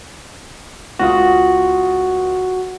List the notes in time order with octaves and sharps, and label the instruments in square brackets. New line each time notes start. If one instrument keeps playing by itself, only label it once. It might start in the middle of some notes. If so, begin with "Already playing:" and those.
[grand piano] C#2 F4 D#6 [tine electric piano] F#4